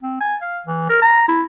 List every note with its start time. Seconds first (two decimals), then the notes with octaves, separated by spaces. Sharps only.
0.03 C4
0.21 G#5
0.42 F5
0.67 E3
0.89 A#4
1.02 A#5
1.28 E4